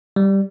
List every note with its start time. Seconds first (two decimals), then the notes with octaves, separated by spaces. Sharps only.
0.16 G3